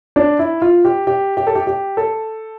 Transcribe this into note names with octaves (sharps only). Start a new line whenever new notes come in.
D4
E4
F4
G4
G4
G4
A4
G4
G4
A4